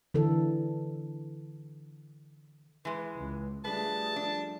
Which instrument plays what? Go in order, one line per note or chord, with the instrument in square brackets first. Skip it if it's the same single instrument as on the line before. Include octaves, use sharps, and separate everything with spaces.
[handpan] D3 E3 A4
[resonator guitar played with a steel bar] E3 G#3 [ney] B4
[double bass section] C#2
[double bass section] F3 G3 A3 [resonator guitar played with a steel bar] D4 B4 [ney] G#4 [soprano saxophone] A5
[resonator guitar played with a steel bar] D4